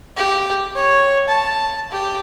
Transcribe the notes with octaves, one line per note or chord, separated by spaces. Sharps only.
G4
C#5
A5
G4